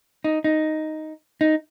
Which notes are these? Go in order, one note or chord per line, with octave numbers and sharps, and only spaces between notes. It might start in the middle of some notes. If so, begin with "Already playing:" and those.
D#4
D#4
D#4